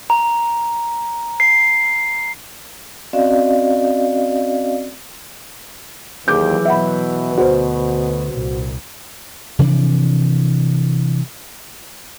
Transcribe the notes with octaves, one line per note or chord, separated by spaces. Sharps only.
A#5
C7
C4 C#4 F#4 D5 D#5 F5
D#2 E3 F#3 G#4 D6 G6
B2 E5 F#5 B5
D2 F#4 B4 C5
C2 A#2
C3 E3 F3 D4